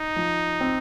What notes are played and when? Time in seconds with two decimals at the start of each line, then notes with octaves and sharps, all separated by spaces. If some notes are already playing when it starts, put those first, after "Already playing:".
Already playing: D#4
0.16 F3
0.61 C4